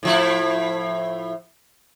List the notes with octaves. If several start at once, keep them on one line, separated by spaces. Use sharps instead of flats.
A2 F3 E4